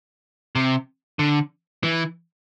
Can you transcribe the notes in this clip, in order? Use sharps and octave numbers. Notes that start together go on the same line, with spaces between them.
C3
D3
E3